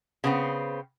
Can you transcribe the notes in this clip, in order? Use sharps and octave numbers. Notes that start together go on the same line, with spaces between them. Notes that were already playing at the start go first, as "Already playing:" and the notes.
C#3 B3 C4